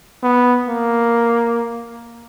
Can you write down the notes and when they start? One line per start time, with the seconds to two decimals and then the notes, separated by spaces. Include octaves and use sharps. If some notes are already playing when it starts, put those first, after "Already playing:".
0.23 B3
0.69 A#3